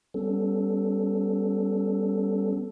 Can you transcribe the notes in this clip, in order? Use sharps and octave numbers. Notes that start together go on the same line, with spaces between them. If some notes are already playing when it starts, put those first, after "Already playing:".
G3 B3 C#4 A4